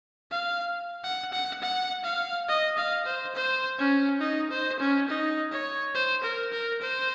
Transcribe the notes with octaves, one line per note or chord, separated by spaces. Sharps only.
F5
F#5
F#5
F#5
F5
D#5
F5
C5
C5
C#4
D#4
C5
C#4
D#4
C#5
C5
A#4
A#4
C5